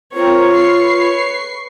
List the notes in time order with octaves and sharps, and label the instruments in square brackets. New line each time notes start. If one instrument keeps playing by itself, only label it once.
[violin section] C4 A#4 A#5 [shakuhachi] F4 [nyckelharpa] C#5
[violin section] B4 C#6 C7